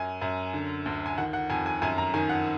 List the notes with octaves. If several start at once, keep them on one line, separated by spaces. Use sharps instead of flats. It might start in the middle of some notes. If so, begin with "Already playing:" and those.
Already playing: F#2 G#5
F#2
D3
D2
G#5
D#3 F#5
F#5
F2 G#5
G#5
F#2 G#5
A#5
D#3 G#5
F#5